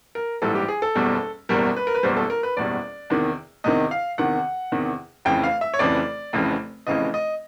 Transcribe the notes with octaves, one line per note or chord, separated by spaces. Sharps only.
A#4
A#1 G#2 E3 G3 A4
G4
G#4
A4
F#1 E2 B2 G3
F#1 E2 B2 G3 A#4
B4
A#4
B4
F#1 E2 B2 G3 C5
A4
A#4
B4
F#1 E2 B2 G3 D5
E2 C3 D#3
E2 C3 D#3 D#5
F5
E2 C3 D#3 F#5
E2 C3 D#3
F1 F2 C#3 E3 G5
F5
E5
C#5
F1 F2 C#3 E3 D5
F1 F2 C#3 E3
F1 F2 C#3 E3 D#5
D#5